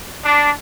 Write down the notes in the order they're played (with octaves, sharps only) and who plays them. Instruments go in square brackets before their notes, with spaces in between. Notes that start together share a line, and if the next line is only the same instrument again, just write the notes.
[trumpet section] D4